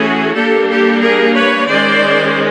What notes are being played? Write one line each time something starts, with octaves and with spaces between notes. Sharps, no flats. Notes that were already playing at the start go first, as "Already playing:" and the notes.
Already playing: E3 A3 C#4 F#4 G#4
G3 A#3 D4 G4 A4
G4 A4
G#4 A#4
B4 C#5
D#3 G#3 C#4 C5 D5